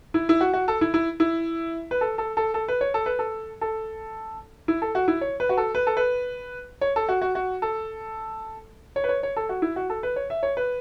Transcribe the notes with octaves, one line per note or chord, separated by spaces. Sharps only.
E4
E4
F#4
F#4
A4
E4
E4
E4
B4
A4
A4
A4
A4
B4
C#5
A4
B4
A4
A4
E4
A4
F#4
E4
C#5
B4
F#4
A4
B4
A4
B4
C#5
A4
F#4
F#4
F#4
A4
C#5
B4
C#5
C#5
A4
F#4
E4
F#4
A4
B4
C#5
E5
C#5
B4